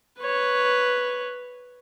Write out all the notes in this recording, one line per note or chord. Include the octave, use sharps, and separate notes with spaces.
B4 C#5